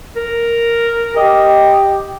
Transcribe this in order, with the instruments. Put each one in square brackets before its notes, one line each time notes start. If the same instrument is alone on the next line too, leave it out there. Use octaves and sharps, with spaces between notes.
[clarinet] A#4
[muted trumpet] G4 [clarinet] D#5